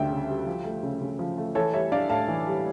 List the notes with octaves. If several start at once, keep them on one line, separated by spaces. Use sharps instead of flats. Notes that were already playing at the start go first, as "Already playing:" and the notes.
Already playing: D2 C#3 G3 D4 E5 G5
C#3
G3
F3
A3
C#3
C#3
F3
A3
E3 A4 C#5
G3 C#5 E5
D4 D5 F5
A2 F5 A5
E3
G3